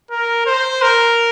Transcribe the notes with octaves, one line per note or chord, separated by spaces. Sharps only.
A#4
C5
A#4